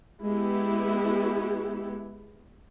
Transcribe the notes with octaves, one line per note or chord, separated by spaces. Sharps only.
G#3 B3 E4 G4